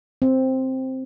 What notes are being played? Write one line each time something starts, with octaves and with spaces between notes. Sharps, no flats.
C4